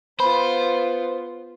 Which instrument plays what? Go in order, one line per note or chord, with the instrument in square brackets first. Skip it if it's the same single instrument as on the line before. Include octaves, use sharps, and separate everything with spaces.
[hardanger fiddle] B3 F4 [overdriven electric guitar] C5 [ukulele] B5